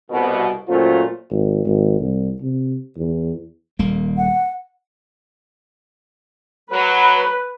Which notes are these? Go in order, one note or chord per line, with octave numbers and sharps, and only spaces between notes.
C2 B2
F#2 A#2 F#3 A3 F4 C5
G#1
G#1
C2
C3
E2
D#1 G3 A#3
F#5
F#3 B4